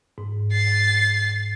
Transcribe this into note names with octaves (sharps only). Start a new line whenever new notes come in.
G#2
A6 C7